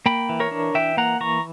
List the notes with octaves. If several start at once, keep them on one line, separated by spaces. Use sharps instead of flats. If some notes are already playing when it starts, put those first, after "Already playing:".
A#3 G5 B5
E3
A#4 C#5
D4
E3 E5 G5
A#3 F#5 A#5
E3 A#5 C#6